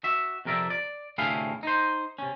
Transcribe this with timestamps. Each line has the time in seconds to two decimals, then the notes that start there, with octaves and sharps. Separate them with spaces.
0.04 F#4 E5
0.45 F2 C3 A#4 D5 E5
0.70 D5
1.18 D2 A2 C3 E4 G#4 F5
1.63 D#4 C5
2.19 C3 C#4